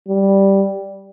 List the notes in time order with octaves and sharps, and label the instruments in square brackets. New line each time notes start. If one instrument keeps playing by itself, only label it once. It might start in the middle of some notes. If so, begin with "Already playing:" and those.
[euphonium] G3